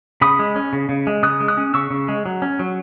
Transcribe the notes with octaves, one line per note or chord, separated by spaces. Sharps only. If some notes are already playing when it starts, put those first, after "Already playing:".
C#3 B5 D#6
G#3
C#4
C#3
C#3
G#3
C#3 D#6 F#6
G#3
D#6 F#6
C#4
C#3 C#6 E6
C#3
G#3
F#3
C#4
F#3